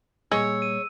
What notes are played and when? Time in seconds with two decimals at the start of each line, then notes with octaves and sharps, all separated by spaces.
0.31 A#2 G3 A#3 G#4 C#5 D#5 C#6 E6
0.62 D#7